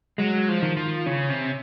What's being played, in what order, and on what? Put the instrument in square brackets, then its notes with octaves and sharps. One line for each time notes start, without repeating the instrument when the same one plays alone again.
[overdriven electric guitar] F#3 [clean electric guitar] G#3
[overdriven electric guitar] F3
[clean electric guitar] D#3
[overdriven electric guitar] F3
[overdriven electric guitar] C#3 [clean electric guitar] C#4
[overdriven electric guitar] C3